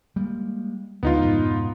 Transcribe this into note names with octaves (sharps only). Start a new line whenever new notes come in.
G3 G#3 A#3
D2 G#3 B3 D#4 F4
F2 G#2 B2